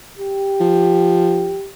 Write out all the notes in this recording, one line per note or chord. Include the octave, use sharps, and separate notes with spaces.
G4
F3